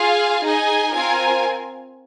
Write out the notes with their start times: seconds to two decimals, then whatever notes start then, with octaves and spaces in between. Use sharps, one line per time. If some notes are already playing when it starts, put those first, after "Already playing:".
Already playing: F4 G#4 F5 G#5
0.44 D#4 G#4 D#5 G#5
0.94 C4 F4 A#4 G#5